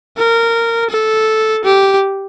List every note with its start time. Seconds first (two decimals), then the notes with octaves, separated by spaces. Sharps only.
0.17 A#4
0.90 A4
1.64 G4